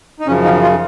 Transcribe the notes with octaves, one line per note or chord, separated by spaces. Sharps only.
D#4
F#2 C#3 F3 C#4
D#3 D#4
F3 F4